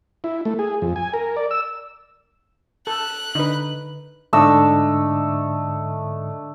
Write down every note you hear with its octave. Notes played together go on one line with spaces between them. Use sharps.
E4
A3
G#4
F2
G#5
A#4
D5
E6
A4 F#6
D3 D#4 B4
G#2 D3 A3 D4 D#5 E6